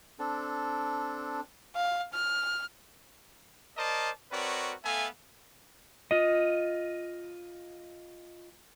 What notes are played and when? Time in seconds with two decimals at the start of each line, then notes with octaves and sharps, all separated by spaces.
0.19 C4 D4 A4
1.75 F5
2.13 F6
3.77 A#4 C5 D5 D#5 A5
4.32 C4 F#4 A#4 B4 C#5 D5
4.84 A3 B3 A4 E5 F5 G#5
6.11 F4 D#5